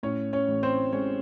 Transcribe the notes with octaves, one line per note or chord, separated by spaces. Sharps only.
A2 C#4 C#5
C#4 C#5
A1
C4 C5
G#3 C#4 C#5